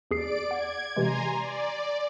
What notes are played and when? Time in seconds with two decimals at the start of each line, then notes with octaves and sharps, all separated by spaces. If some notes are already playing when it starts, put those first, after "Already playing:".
0.11 E2 G#4 D5 C7 D7
0.51 F#5 G#6
0.96 C3 E3 G#3 G#5 A#5 C6
1.35 D5